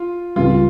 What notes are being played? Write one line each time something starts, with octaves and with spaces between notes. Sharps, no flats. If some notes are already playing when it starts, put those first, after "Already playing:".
Already playing: F4
C#2 C#3 G3 F4